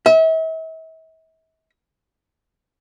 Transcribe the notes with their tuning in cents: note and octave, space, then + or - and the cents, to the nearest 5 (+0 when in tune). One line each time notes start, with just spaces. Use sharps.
E5 -40